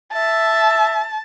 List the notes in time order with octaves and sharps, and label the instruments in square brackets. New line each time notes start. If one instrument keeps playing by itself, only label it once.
[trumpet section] E5 [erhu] A5